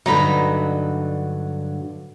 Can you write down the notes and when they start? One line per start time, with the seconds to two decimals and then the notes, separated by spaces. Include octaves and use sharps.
0.06 G2 D3 F#3 D#4 A#5 B5